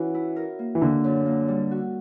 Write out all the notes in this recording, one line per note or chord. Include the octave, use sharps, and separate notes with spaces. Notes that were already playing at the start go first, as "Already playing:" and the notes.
Already playing: E3 C#4 F#4
E4
A#4
A#3
E3
D3 A#3
F#2
A#3
G3
F#4